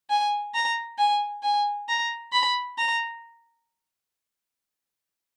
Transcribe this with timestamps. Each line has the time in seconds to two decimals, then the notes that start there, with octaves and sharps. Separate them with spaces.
0.10 G#5
0.54 A#5
0.98 G#5
1.43 G#5
1.89 A#5
2.33 B5
2.78 A#5